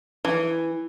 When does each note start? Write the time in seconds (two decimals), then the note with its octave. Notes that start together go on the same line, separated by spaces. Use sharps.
0.25 E3